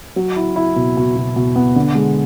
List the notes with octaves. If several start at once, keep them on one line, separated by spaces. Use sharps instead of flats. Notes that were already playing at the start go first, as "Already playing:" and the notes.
F#3
E4
E4
B2
B2
B2
B2
B3
D3
G#3